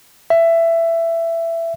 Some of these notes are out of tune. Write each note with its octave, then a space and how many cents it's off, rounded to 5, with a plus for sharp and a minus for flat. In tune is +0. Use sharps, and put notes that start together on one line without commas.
E5 +15